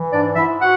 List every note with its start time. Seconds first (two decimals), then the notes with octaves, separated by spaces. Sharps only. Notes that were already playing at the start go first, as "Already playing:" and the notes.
Already playing: E3
0.12 G#2 D4 D5
0.36 G#2 E4 E5
0.60 F#4 F#5